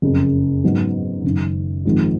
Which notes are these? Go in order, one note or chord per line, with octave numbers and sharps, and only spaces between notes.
F#1 F2 C#3
G#2 F#3 B3
F#1 F#2 D#3
G#1 G#2 F3 G#3